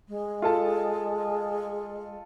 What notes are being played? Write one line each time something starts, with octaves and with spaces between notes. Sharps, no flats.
G#3
F4 A4 A5